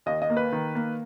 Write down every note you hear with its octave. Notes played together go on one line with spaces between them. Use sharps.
D#2 D#5
D#5
A#3
B4
D#3
A#3